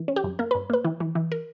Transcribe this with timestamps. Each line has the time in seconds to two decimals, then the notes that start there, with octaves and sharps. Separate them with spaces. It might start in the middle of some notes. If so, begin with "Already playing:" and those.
Already playing: E3
0.08 C#4
0.16 G4
0.24 F#2
0.39 A#3 A#4
0.51 B4
0.55 G2
0.70 A#3 B4
0.84 E3
1.00 E3
1.15 E3
1.32 A#4